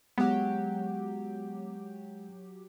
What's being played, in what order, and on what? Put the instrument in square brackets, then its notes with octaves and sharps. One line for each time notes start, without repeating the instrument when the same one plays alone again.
[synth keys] F#3 G4 [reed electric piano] G#3 F#5 [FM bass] B3